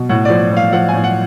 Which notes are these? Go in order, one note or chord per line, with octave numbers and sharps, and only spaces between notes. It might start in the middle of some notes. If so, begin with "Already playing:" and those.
Already playing: B2
A2 F#5
F3 D5
A2
F5
F3 F#5
A2 G#5
F#5